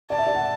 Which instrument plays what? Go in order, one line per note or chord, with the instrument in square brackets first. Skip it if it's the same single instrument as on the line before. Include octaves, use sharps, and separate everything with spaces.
[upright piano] D5 [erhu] A5
[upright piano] E5
D5
F#5